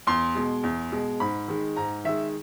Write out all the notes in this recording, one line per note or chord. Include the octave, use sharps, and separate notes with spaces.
E2 C6
B2 G#3
E2
B2 G#3
G#2 B5
D#3 G#3
G#2 A#5
D#3 G#3 E5